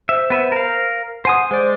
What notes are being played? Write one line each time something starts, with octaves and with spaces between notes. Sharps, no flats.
C5 E5
B3 B4 E5
A#4 F5
C5 F#5 G#5 D#6
G#3 C5 D5